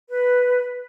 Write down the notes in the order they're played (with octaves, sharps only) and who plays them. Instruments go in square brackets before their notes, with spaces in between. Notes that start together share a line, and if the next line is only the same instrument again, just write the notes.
[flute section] B4